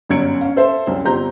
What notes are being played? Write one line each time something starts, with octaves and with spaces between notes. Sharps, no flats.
G1 F#2 C#4 G#6 C#7 D7
C#4 F5
A4 C5 E5
C2 F#2
G1 C4 F4 G4 A#5 G6